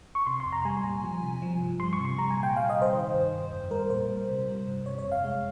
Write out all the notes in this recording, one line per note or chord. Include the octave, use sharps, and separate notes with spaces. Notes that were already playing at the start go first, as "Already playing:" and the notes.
C#6
C3 C6
C6
F2
A#5
G3 G#5
A#2
F3
C3
F3
G2
G3 C6
C#6
C3
C6
G3 A#5
G#5
A#2
G5
G3 F5
D#5
C3
C5
D#3
G2
D#3
F2
G3 A#4
A#2 C5
G3
C3
G3
G2
C3 C#5
C#5
F2
F5
G#3